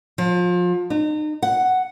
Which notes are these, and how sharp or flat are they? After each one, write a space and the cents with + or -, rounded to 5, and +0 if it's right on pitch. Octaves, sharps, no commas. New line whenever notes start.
F3 +30
D#4 -35
F#5 +5